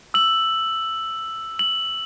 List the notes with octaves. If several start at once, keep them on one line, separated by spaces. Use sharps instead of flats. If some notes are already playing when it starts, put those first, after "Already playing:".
E6 F#7
F#7